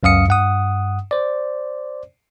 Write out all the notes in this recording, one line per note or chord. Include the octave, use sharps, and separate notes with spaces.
C#2 F#2 F5 D#6 C#7
G2 F#5 D#6
C5 D5